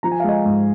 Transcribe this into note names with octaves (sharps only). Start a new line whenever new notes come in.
F3 A#5
G#5
F5
G#3 D#5 G#5
G#2